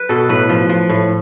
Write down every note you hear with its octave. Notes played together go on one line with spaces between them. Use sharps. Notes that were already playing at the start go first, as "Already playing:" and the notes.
Already playing: B4
B2 A4
A2 B4
F3
F3
A2